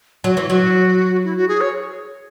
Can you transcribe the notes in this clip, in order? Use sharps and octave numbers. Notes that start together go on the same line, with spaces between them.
F#3 F#4
E3
F#3 F#4
E4
F#4
G#4
C#5